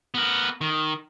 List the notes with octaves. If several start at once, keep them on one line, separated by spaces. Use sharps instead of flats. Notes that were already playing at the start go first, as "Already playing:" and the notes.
B3 A#4
D#3